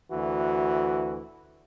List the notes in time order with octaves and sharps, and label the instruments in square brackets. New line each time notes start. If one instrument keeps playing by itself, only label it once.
[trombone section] D2 E3 F#4